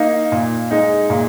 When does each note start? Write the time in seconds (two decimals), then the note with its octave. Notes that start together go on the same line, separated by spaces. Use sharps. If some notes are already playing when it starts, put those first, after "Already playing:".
Already playing: A#3 D#4
0.32 A#2
0.71 G#3 D#4
1.10 A#2